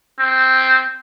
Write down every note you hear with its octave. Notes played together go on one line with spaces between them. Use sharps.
C4